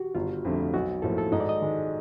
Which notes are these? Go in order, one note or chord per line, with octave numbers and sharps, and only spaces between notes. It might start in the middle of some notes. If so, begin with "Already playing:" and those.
Already playing: F#4 G4
G1 F4
F2 D3 F3 A3
B1 F#4
A2 F3 A#3 A4
A4
G#2 D#5
D5
D#5
D#3 G#3